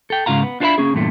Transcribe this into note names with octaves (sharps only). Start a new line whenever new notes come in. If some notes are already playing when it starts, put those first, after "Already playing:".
A4 G5
G#2 C#3 F4 F5 A#5
B3
D4 F4 A4 B4 E5 B5
A#3 C#4 G#4
E2 G2 A#2 A3